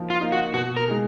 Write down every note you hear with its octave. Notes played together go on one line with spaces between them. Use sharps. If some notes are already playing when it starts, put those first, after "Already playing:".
Already playing: F3 A#3 D#4
F4
A#3 D#4
F#4
B2 F#4
A#4
G#3 D#4 G#4